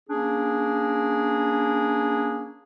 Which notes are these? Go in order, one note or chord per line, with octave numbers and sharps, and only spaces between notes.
A#3 C#4 D4 G#4